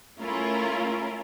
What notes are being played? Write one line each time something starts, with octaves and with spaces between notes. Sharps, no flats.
A3 C#4 E4 F4 A#4